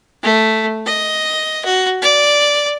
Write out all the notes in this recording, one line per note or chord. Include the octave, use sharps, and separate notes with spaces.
A3
D#5
F#4
D5